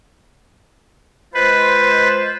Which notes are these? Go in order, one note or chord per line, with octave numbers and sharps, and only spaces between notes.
G#3 F4 B4 C5